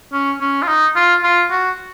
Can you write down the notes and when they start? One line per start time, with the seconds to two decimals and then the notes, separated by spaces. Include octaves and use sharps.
0.13 C#4
0.41 C#4
0.63 F4
0.68 D#4
0.96 F4
1.24 F4
1.51 F#4